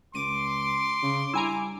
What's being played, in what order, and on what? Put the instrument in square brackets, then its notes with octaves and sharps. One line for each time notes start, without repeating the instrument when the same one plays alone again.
[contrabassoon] C#2 [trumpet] C6 [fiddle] D6 [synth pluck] D#7
[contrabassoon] C#3
[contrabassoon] G2 [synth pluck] E4 G#5 A#5